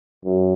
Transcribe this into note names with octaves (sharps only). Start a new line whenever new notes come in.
F#2